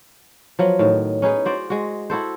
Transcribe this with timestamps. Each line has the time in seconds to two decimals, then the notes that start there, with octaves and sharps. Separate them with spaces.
0.59 F3 F#3 B3
0.79 A2 D#3
1.22 C#4 D#4 G#4 B4
1.45 F#4 C5 D5
1.70 G#3 F#4
2.10 E4 F#4 A4 C5